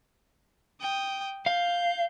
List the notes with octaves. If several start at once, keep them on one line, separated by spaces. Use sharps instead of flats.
G5 D#6
F5 G6